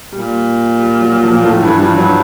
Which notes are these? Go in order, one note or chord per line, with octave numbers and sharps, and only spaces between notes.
A#2 G3
G3
F#3
F3
A#2
A2 F3
G2 E3
G2 F3
G2 F#3